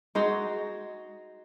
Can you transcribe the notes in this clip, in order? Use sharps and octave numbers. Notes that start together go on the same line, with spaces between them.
G#3 D#4 F#4